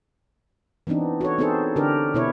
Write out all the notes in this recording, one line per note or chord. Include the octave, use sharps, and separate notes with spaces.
E3 B3 C4 D4 D#4
F#4 A4 C#5
B3 C4 D#4 G#4 A4 C5
D3 D4 G4 A#4
B2 B3 E4 C#5